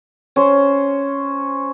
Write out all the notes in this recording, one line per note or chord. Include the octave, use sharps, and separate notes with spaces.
C#4 C5